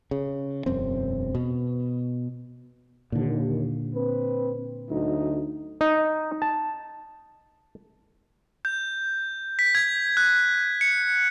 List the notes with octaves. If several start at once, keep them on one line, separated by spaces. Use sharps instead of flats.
C#3
E1 F#2 C4
B2
D#2 A#2 D3
C4 B4
D2 F#3 D#4
D#4
A5
G6
B6
G#6
F#6
C#7